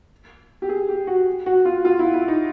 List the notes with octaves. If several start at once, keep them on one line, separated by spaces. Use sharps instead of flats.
G4
G#4
G4
F#4
F#4
F4
F4
E4
E4
D#4